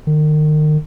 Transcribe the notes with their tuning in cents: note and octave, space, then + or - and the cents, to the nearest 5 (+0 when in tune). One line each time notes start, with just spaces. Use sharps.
D#3 -35